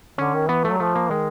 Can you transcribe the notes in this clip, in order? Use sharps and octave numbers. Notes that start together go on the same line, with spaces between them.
D3 C#4
D#3
E3 B3
A3
F#3
F3 A3
A#3
D#3 G#3